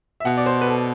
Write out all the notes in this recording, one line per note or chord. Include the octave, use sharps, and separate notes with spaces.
E5
B2 F#5
D5
C5
B4
A4